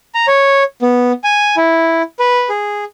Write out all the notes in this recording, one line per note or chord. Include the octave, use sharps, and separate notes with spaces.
A#5
C#5
B3
G#5
E4
B4
G#4